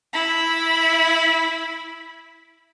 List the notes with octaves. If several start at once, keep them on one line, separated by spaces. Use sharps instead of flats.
E4 B5